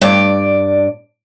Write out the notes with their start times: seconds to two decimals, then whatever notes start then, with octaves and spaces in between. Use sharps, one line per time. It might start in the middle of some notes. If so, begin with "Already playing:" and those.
0.01 G2 D5